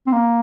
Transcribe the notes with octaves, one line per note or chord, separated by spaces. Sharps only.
C4
A#3